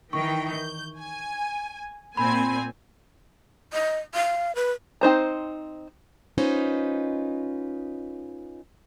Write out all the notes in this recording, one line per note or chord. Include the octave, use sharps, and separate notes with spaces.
D#3 E3 G5 C#6
G6
G#5
A#2 C4 G#5 B5
D#5
F5
B4
C4 D#4 C5 A#5
C#4 D#4 F4 B4 C5 D#5